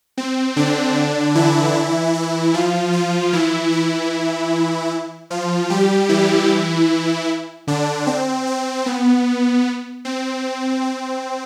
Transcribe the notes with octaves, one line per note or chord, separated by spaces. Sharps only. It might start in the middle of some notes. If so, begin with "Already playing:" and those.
C4
D3 D4
E3 E4
E3 E4
F3 F4
F3 F4
E3 E4
E3 E4
F3 F4
G3 G4
E3 E4
D3 D4
C4
C4
B3
C4
C4